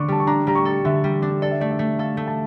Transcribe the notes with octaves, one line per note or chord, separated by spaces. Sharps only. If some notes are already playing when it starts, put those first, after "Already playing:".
Already playing: D3 D4 C#6 D6
G3 A5
C#6
D4 A#5
G3 A#5
C#6
A4
D3 E5
G3
D4
A4 D5
E5
A3 D5
E5
A3
A4 F5
A3
A5